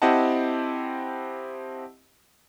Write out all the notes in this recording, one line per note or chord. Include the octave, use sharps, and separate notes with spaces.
C4 E4 G4 D#5 F#5 A5